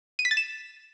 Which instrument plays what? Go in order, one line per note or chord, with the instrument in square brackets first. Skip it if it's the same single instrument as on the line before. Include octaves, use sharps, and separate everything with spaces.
[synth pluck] D#7
B6
A6
E7